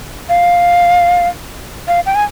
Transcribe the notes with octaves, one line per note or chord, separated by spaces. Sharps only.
F5
F5
G5
G#5